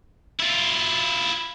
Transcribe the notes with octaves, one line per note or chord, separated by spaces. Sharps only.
E4 F4